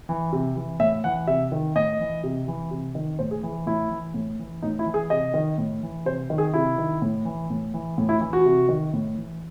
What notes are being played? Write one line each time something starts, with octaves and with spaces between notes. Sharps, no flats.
E3
C3
E3
A2 E5
E3 F#5
C3 E5
D#3
A2 D#5
E3
C3
E3
C3
D#3
A2 C5
G#4
E3
A2 E4
E3
A2
E3
A2 D#4
E4
E3
G#4
C3 D#5
D#3
A2
E3
C3 C5
D#3
G#4
C3 E4
D#3
A2
E3
A2
E3
A2
E4
E3 E4
F#4
C3
D#3
A2
E3